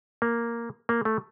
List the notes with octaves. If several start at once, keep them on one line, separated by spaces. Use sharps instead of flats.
A#3
A#3
A3